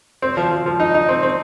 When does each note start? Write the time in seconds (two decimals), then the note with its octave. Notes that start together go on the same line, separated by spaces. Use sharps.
0.22 C4
0.37 F3
0.51 F3
0.66 F3
0.80 D#4
0.94 D#4
1.09 C4
1.23 C4